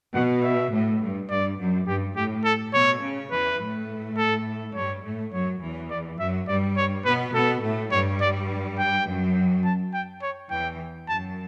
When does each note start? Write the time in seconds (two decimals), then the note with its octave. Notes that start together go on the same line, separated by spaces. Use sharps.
0.15 B2 F#5
0.44 E5
0.72 A2
1.01 G2
1.30 G2 D5
1.59 F#2
1.87 G2 G4
2.16 A2 G4
2.45 A4
2.74 B2 C#5
3.03 C#3
3.31 E2 E3 B4
3.60 A2 A3
4.18 A4
4.75 G2 G3 C#5
5.04 A2 A3
5.33 F#2 F#3 C#5
5.62 E2 E3
5.90 D5
6.19 F#2 F#3 E5
6.48 G2 G3 D5
6.77 C#5
7.05 B2 B3 B4
7.34 B2 B3 A4
7.63 A2 A3
7.92 G2 G3 C#5
8.21 D5
8.78 G5
9.07 F#2 F#3
9.65 A5
9.93 G5
10.22 C#5
10.51 E2 E3 G5
11.08 F#2 F#3 A5